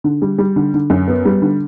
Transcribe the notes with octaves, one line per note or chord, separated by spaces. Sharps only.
D3
G3
G3
D3
D3
F#2
B3
G3
D3